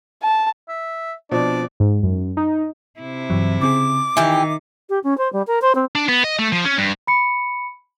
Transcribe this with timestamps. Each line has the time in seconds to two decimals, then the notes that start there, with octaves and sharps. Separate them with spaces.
0.23 A5
0.69 E5
1.31 B2 F3 C4 D4 D5
1.80 G#2
2.03 F#2
2.37 D#4
2.99 C3 E4
3.30 G2 E3 F#3
3.61 C#3 C4 G#4 D6
4.17 D#3 E3 G4 E5
4.89 G4
5.03 C#4
5.17 C5
5.32 G3
5.47 A#4
5.61 C5
5.75 C4
5.95 D4
6.09 B3
6.24 D#5
6.39 A3
6.52 F3
6.65 C#4
6.78 G2
7.07 B5 C#7